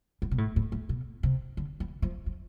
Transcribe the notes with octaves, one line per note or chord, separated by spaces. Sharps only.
G2
B2
A2
A2
A2
B2
C3
D3
E3
F3
F3